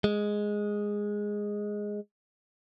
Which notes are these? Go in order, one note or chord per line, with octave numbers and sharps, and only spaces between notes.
G#3